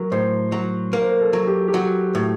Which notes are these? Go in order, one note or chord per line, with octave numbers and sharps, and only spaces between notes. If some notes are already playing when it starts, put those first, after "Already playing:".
Already playing: F#3 A#4
A2 C5
F#3
A#3 A#4
C5
A#4
A4
F#3
G4
G4
F#3 F#4
A2